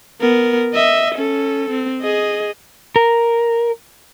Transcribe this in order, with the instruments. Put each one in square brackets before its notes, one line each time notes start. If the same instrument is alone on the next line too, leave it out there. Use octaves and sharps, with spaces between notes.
[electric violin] B3 A#4
D#5 E5
C#4 A4
C4
G#4 D#5
[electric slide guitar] A#4